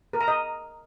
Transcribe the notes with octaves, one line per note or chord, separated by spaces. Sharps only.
A#4
A#5
D#5